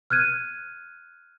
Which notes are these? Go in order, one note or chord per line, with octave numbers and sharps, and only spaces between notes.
F6 F#6 G#6 D#7